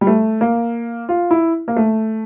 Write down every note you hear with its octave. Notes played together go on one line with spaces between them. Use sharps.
G3
A3
A#3
F4
E4
A#3
A3